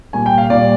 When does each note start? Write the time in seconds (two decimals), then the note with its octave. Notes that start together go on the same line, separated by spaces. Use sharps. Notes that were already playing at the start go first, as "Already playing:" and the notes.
0.13 A#2 G3 A#3 G#5
0.26 G5
0.38 F5
0.50 A#2 G3 A#3 D5